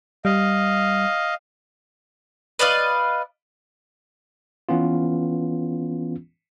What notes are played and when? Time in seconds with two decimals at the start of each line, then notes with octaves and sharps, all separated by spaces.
0.25 G3 D#5 F5
2.59 B4 D5 D#5 F5
4.69 E3 B3 C#4 F4